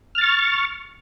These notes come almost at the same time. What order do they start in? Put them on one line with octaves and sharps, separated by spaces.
F6 A6 C#6